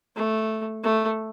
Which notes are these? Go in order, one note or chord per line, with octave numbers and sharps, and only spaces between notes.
A3
A3